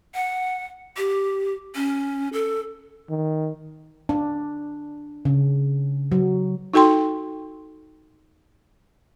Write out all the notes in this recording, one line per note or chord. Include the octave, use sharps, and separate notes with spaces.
F#5
G4
C#4
A4
D#3
D4
C#3
F#3
D#4 F#4 A4 G5 C6